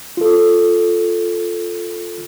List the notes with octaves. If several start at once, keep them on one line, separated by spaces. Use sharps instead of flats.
F4 A4